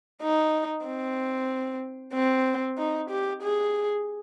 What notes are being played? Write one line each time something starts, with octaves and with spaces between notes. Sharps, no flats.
D#4
C4
C4
D#4
G4
G#4